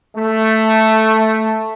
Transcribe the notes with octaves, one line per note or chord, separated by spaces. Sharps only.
A3